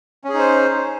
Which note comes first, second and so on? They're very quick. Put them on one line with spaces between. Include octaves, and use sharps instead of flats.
C#4 G#4 D#4 C5